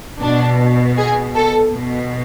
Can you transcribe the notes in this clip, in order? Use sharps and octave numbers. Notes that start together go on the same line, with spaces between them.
B2 D4
G#4
A4
B2